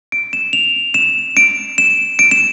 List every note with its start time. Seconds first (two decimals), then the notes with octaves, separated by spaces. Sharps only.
0.12 D7
0.33 E7
0.53 F7
0.94 E7
1.37 D7
1.78 E7
2.19 D7
2.31 E7